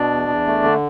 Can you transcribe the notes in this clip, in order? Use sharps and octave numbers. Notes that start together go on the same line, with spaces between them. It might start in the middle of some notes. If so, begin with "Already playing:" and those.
Already playing: B2 D4 D5
E2
E2
A3
D3